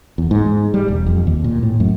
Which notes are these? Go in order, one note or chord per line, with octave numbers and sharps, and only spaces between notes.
E2
G#2
G3
E1
F2
D#2
A#2
A2
F#2